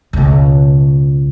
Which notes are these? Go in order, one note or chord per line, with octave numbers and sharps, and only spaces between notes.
C#2 B2